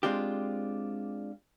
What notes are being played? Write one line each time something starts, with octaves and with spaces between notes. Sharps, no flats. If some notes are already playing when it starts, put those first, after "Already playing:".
G#3 C4 D4 F4 G4